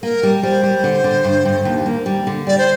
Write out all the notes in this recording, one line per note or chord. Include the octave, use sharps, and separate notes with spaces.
A#3 A#4
G3
G3 C5
G3
D3
D3
G2
G2
D#2
A#3
G3
D3
G3 D5
C5